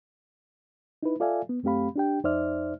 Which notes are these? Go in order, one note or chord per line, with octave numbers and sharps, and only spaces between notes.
D#4 E4 B4
F4 A4 D5 E5 F5 G#5
B3
F#2 A3 C4 G4 F5 B5
D4 G4 G5
F2 D#4 C5 D5 E5 F6